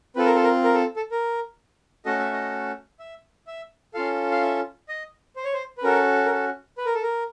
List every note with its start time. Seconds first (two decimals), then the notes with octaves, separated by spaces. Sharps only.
0.16 C4 F4 A4 B4
0.25 A#4
0.35 A4
0.43 A#4
0.64 A#4
0.74 A4
0.96 A4
1.11 A#4
2.05 A3 C#4 F#4 A4 D#5
2.19 E5
2.32 D#5
3.00 E5
3.47 E5
3.94 C#4 F4 A4 F5
4.31 F5
4.42 E5
4.89 D#5
5.36 C5
5.44 C#5
5.53 C5
5.78 B4
5.83 C#4 F#4 A4 A#4
6.26 A#4
6.31 A4
6.78 B4
6.86 A#4
6.94 A4
7.02 A#4